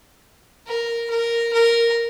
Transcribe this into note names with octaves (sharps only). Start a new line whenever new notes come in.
A#4
A#4
A#4